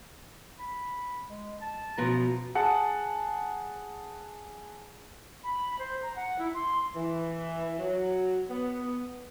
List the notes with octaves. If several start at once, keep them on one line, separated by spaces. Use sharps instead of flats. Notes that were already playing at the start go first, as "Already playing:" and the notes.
B5
G#3
A5
F#2 B2 F3 A#5
G#4 F#5 A5
B5
C5
A#5
F#5
E4
C6
E3
F#3
B3